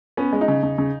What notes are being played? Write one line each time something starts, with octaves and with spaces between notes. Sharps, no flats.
B3 C#4
G#3
D#4
C#3
C#3
C#3